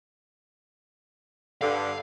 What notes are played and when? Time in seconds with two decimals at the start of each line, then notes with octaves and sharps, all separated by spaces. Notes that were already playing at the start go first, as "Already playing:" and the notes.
1.61 G2 D3 F5